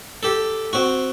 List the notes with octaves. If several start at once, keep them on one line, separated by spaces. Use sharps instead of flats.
G4 A4
C4 F#4